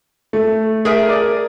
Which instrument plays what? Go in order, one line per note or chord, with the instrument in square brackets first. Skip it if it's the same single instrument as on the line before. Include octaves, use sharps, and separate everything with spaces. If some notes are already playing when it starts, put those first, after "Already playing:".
[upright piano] A3
[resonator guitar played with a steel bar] G#4 A#4 E5
[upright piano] D5